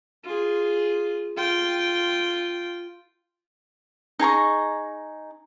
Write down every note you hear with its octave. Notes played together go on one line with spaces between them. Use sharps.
F4 G#4
F4 G5
D#4 G#4 A#5 C#6